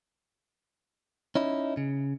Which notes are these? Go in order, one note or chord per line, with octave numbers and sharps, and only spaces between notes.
C#4 D#4 E4
C#3